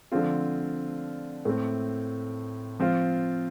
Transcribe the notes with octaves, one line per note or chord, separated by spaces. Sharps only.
D3 F3 A3 C4 F4
A2 A3 C4
F3 C4 F4